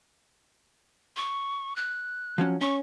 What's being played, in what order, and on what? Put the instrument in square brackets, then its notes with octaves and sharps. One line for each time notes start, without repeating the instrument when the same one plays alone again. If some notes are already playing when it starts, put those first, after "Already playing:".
[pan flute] C#6
F#6
[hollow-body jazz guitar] F3 F#3 C#4
[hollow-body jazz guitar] C#4 [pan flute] C#6